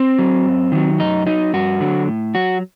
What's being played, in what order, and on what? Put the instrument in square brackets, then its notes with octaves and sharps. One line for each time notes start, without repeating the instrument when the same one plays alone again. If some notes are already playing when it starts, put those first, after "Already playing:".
Already playing: [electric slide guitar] C4
F#3
F#2
D#3 F#3
F#2 D#4
F#3 D#4
G2 F#4
D3 F#3
A2
F#3 F#4